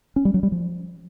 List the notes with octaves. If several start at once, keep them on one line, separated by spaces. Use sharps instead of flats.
C#4
G3
F#3
G3
F3